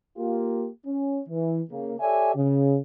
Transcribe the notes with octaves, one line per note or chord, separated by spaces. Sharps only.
A#3 F4 G4
C#4
E3
C#3 A#3
G4 A4 C#5 D5 E5 G#5
C#3